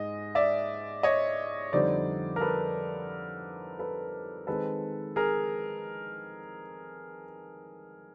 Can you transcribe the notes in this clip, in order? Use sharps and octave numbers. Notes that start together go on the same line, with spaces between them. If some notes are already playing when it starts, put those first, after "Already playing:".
Already playing: G#2 G#3 D#5
D5 E5
C#5 D#5
F2 D3 G3 C4 D#4 C5 D5
A#4
A4 B4
A4 B4
D#3 G#3 C4 D#4 A4 B4
G#4 A#4